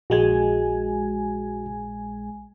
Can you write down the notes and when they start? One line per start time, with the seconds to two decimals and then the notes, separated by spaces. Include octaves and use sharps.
0.10 A#1 G#3 F#4 G#4 G#5